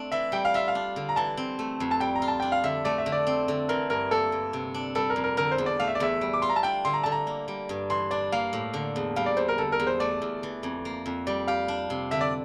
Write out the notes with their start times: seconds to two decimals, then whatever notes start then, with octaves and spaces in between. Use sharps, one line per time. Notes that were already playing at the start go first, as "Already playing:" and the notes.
Already playing: A3 C4 D4
0.12 E3 E5
0.32 G3 G5
0.45 F5
0.54 F4 E5
0.68 F5
0.75 D4
0.96 D3
1.09 A#5
1.16 E3 A5
1.37 C4
1.59 A3
1.80 F2
1.91 A5
2.00 G3 G5
2.15 A#5
2.22 F4
2.28 A5
2.40 D4 G5
2.52 F5
2.64 D3 E5
2.85 A3 D5
2.98 E5
3.06 D3
3.12 D5
3.27 C4
3.48 D3
3.69 E3 A#4
3.90 G2 A#4
4.11 A#3 A4
4.32 G2
4.53 C3
4.74 D4
4.95 G3 A4
5.10 A#4
5.16 F2
5.24 A#4
5.37 D3 A#4
5.51 C5
5.58 E2
5.66 D5
5.80 A3 F5
5.88 E5
5.95 D5
6.00 E2 E5
6.21 G3
6.34 D6
6.42 F4 C6
6.50 A#5
6.56 A5
6.63 D4 G5
6.85 D3 C6
6.94 A#5
7.03 D3 A5
7.12 A#5
7.27 A#3
7.48 G3
7.69 G2
7.90 E3 C6
8.11 D4 D5
8.32 A#3 F5
8.53 A2
8.74 D3
8.96 E2
9.16 G3 F5
9.26 D5
9.37 E2 C5
9.48 A#4
9.58 D3 A4
9.72 A#4
9.80 E2
9.87 C5
10.00 A3 D5
10.22 E2
10.43 E3
10.63 F2
10.85 A#3
11.06 F2
11.27 G3 D5
11.48 G4 F5
11.68 D4
11.90 C3
12.11 D3 E5
12.21 D5